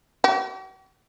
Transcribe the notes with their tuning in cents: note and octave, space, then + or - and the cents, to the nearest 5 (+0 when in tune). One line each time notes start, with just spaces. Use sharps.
F#4 +45